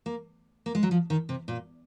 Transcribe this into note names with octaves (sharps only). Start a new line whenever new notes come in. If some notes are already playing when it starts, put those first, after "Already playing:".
A#3
A#3
G#3
F#3
F3
D#3
C3
A#2